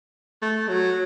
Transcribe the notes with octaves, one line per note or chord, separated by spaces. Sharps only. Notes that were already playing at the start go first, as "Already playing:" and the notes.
A3
F#3